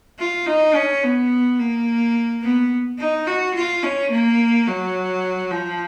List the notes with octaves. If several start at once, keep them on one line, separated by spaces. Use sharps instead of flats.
F4
D#4
C#4
B3
A#3
B3
D#4
F#4
F4
C#4
A#3
F#3
F3